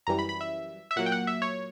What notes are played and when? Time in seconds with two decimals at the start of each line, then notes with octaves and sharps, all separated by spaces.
0.07 F#2 E3 G3 A#5
0.19 B5
0.29 B5
0.41 E5
0.91 E5
0.96 A#2 F#3 A#3 F#5
1.06 G5
1.12 F#5
1.27 E5
1.42 C#5